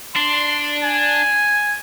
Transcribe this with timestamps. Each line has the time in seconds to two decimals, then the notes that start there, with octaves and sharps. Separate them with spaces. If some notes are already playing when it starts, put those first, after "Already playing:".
0.16 D4 C6
0.83 G#5